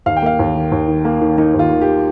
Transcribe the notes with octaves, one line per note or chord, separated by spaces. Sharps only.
D#2 F5
G5
A#3 F5
D#2
D#3
D#2
D#3
A#3
D#3
A#3 D#4
D#2 F4
D#3
G4